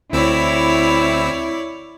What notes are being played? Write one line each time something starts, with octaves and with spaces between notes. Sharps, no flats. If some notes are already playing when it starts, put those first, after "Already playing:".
D2 C4 E4 C#5 D5 E6